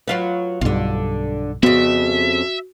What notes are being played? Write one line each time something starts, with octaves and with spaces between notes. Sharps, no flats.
F#3 F4 B4
B1 G2 D3 F4
F2 C#3 B3 F#4 E5